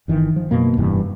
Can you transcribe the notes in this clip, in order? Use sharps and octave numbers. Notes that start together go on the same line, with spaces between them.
G1 D#3 E3
F3
F#2 B2 A#3
F1 G2 E3